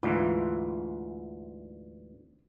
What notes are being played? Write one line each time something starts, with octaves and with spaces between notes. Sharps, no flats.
D2 G#2 E3 F4